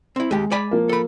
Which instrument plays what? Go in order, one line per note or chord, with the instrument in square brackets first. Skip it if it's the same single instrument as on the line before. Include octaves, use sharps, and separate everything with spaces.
[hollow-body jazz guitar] C4 E4
[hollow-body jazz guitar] D#2 G4 [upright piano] G#3
[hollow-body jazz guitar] D5 G#5 B5
[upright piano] F3 A#3
[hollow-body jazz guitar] A4 B5